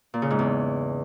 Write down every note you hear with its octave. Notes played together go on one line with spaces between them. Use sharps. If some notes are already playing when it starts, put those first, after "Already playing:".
A#2
C#3
G#2
E2